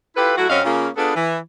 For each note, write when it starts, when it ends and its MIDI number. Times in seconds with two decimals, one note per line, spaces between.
0.16 0.33 64
0.16 0.33 65
0.16 0.33 67
0.16 0.33 69
0.16 0.33 71
0.37 0.49 54
0.37 0.49 57
0.37 0.49 64
0.37 0.49 66
0.50 0.61 42
0.50 0.61 54
0.50 0.61 60
0.50 0.61 61
0.50 0.61 75
0.50 0.61 77
0.64 0.88 49
0.64 0.88 58
0.64 0.88 65
0.97 1.15 59
0.97 1.15 62
0.97 1.15 65
0.97 1.15 68
0.97 1.15 69
0.97 1.15 71
1.15 1.37 52